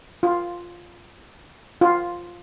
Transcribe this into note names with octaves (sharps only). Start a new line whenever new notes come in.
F4
F4